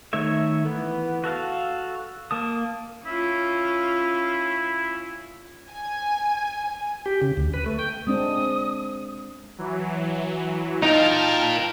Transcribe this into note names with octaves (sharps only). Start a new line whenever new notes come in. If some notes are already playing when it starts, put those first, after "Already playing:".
D#3 A3 C#5 E5
E3 B3
F#4 A4 F5
A#3 A5 D#6
C#4 E4 F4
G#5
G4
C#3
D2
B4
A3
G5
G#3 C4 D4 D#6
E3 F#3
D#4 F4 A#4 G5 A5 F6